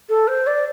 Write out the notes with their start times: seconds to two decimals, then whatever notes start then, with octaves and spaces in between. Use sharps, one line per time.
0.09 A4
0.28 C5
0.47 D5